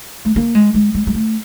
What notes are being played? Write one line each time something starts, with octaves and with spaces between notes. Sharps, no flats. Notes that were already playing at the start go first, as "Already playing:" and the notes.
A3
A#3
G#3
G#3
G#3
G#3
A3